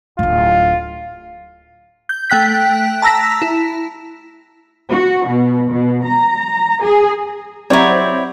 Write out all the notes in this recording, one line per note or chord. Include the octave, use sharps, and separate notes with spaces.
D1 G#1 F4
G6
A3 G5 F#6 B6
A5 A#5 E6 A#6 B6
E4
F#4
B2
B2
A#5
G#4
F#3 C4 E4 G4 C#5 D5 F#5 A#5